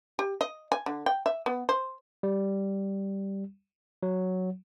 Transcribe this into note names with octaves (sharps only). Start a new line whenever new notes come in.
G4
D#5
G#5
D3
G5
E5
B3
C5
G3
F#3